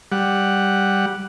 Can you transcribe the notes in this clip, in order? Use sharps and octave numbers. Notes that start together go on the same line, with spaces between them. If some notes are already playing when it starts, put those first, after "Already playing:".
G3 F#5